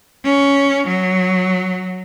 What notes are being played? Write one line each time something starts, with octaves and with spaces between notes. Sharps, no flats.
C#4
F#3